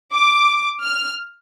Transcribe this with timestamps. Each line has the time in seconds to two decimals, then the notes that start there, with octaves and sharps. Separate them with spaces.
0.14 D6
0.84 F6